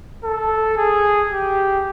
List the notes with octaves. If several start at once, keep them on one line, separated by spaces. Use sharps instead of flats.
A4
G#4
G4